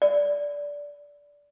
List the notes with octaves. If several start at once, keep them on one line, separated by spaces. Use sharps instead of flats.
D5